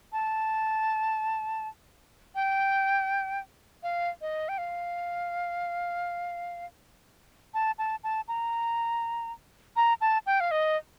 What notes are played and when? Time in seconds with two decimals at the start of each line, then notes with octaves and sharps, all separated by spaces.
0.13 A5
2.35 G5
3.83 F5
4.21 D#5
4.49 G5
4.58 F5
7.54 A5
7.78 A5
8.04 A5
8.28 A#5
9.76 A#5
10.01 A5
10.26 G5
10.40 F5
10.51 D#5